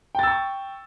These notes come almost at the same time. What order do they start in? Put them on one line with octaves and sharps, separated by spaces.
G5 A6 E6 C#6